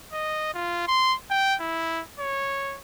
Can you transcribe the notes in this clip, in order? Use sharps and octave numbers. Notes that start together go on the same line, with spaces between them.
D#5
F4
C6
G5
E4
C#5